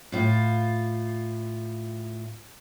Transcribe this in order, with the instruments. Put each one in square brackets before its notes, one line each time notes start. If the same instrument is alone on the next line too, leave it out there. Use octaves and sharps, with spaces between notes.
[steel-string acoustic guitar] A2 F4